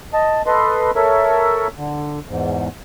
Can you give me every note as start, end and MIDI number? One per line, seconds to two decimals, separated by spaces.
0.13 0.42 75
0.13 0.42 81
0.46 0.91 69
0.46 0.91 71
0.46 0.91 75
0.46 0.91 84
0.96 1.67 69
0.96 1.67 70
0.96 1.67 73
0.96 1.67 76
1.78 2.19 50
2.29 2.68 40
2.29 2.68 44